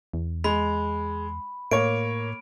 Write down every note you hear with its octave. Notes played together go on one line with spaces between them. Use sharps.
E2
G#3 B5
A2 A#3 C#5 D7